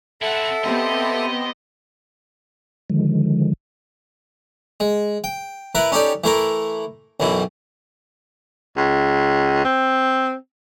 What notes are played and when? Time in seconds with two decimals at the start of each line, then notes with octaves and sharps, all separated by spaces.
0.22 C4 E4 A4 E5 F#5
0.64 B3 C4 G4 D#5
2.90 D3 D#3 F3 G#3
4.80 G#3
5.24 G5
5.75 E4 A#4 B4
5.92 C#4 D#4 G4 A4 D5
6.24 E3 A3 E4 A#4
7.20 B1 F#2 B2 E3
8.77 C#2
9.64 C4